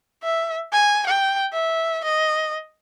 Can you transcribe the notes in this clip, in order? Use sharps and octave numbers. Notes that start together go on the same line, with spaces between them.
E5
G#5
G5
E5
D#5